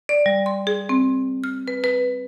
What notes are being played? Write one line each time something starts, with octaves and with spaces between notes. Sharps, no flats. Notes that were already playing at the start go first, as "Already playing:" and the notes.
D5
G3
C6
G#4
C4
F6
B4
B4